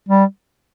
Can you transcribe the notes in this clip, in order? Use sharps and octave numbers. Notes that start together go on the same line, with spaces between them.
G3